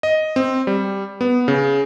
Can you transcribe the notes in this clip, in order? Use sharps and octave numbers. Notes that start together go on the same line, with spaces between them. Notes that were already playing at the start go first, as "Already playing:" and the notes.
D#5
C4
G3
B3
C#3